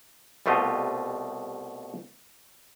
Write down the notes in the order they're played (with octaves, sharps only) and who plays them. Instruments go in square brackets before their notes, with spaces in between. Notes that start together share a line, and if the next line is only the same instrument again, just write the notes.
[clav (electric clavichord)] C2 B2 A3 F4 G4 D#5